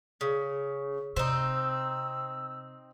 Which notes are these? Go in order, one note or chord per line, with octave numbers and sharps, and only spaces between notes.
C#3
C3 C4 D#4 E6